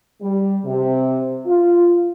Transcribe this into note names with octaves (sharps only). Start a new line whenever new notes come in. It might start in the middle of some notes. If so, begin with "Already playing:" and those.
G3
C3
F4